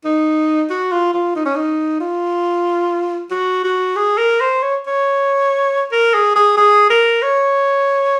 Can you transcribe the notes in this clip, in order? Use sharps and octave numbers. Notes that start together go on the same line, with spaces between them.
D#4
F#4
F4
F4
D#4
C#4
D#4
F4
F#4
F#4
G#4
A#4
C5
C#5
C#5
A#4
G#4
G#4
G#4
A#4
C#5